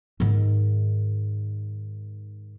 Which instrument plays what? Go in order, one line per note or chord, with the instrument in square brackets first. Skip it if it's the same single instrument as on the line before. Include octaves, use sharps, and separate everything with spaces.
[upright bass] G#2 D#3